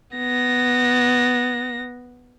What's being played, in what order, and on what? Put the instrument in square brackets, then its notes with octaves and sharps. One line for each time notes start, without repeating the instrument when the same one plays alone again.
[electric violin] B3 A#6